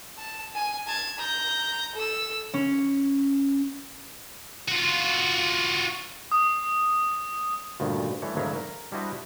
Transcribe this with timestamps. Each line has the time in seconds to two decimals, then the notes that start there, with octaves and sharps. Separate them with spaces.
0.18 A5
0.55 G#5
0.87 A5 G#6
1.18 A#5 G6
1.95 A4 E6
2.54 C#4
4.68 F4 F#4
6.32 D#6
7.80 D2 G2 A#2 D#3
8.22 E3 G3 A3 C#5
8.35 G#1 D2 F#3 D#4 E4 F5
8.55 A#4
8.92 G3 D4 E4 F#4 C5 D#5